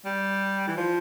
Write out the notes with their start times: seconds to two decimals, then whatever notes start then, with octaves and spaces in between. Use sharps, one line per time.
0.06 G3
0.67 E3
0.77 F3